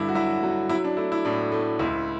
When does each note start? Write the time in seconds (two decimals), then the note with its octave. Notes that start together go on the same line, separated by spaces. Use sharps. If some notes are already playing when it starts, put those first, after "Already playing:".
Already playing: G2 D3 E4
0.09 F#4
0.15 F#3 E4
0.43 F#3
0.69 F#3 E4
0.84 D4
0.97 A3 E4
1.12 E4
1.25 A2 D4
1.52 A3
1.79 C#2 E4